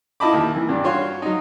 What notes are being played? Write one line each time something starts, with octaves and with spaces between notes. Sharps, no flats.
E4 F4 D#5 A5 B5 D6
D#2
E3
G2 D4
F4 F#4 C#5 C6
F#3 D#4